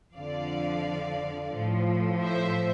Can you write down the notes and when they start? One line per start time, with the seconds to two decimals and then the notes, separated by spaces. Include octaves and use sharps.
0.16 F2 D3 F3 D5 F5
1.53 A2 F3
2.22 C5 E5